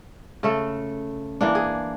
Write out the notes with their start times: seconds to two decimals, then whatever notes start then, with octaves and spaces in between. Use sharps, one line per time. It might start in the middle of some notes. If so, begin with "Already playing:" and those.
0.43 C#3 A3 A4
1.41 E3 A#3 D4
1.55 G#4